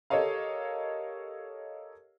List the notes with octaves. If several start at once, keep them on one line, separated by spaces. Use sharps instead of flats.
G4 A4 A#4 C#5 D#5 F5